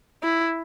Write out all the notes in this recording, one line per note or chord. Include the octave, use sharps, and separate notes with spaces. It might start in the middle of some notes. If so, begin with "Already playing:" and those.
E4